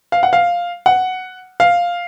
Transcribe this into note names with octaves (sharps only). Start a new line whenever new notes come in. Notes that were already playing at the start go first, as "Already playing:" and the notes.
F5
F#5
F5
F#5
F5